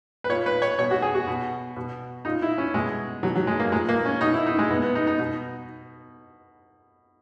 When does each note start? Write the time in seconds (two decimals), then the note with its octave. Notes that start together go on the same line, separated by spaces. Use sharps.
0.24 B4
0.29 A#2 C#5
0.46 B4
0.62 C#5
0.78 B2 C#5
0.91 F#4
1.02 G#4
1.15 F#4
1.27 B2
1.76 B2
2.25 A#2 D#4
2.42 E4
2.58 C#4
2.74 B2 G#3
3.23 B2 F#3
3.35 F#3
3.47 G#3
3.60 A#3
3.72 A#2 G#3
3.89 A#3
4.05 C#4
4.21 B2 D#4
4.34 E4
4.46 D#4
4.59 G#3
4.70 B2 B3
4.82 B3
4.95 D#4
5.07 D#4
5.19 B2